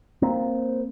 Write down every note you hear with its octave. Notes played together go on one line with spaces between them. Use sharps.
A#3 C4